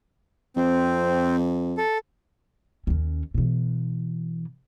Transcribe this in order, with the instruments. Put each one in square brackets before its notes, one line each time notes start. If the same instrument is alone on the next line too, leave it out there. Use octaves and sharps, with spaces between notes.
[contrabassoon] F2 [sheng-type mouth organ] C4
[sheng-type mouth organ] A4
[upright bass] D#2 C#4
B2 E3